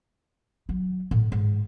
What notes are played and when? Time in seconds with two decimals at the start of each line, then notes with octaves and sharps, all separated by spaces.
0.69 F#3
1.11 A2
1.32 G#2